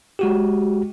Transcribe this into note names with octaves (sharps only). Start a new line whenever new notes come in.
G#3 F#4 G4